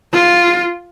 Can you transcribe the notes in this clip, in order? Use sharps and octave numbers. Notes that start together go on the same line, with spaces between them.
F4